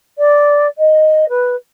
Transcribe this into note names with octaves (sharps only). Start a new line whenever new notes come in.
D5
D#5
B4